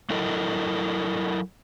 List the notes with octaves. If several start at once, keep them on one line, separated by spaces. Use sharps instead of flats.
F#3 E4 A4 A#4 D#5